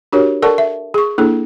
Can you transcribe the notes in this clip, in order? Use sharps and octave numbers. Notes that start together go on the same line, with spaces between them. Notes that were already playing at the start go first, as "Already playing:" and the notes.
D4 F#4 G4 A#4 C#5
A4 A#4 D5 F#5 A5 C#6
E5
G#4 C#6
A#3 D4 E4 G#4 A4